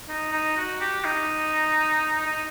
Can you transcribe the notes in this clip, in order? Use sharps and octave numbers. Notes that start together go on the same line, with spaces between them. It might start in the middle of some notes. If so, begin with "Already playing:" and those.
D#4
D#4
F#4
G4
D#4
D#4